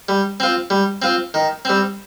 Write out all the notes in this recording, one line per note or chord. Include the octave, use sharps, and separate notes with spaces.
G3
C4 F4
G3
C4 F4
D#3
G3 C4